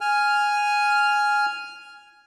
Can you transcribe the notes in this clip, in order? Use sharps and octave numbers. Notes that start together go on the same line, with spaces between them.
G#5 F6